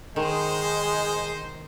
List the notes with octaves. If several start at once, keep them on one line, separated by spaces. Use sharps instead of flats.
D#3 G#3 D#4 C5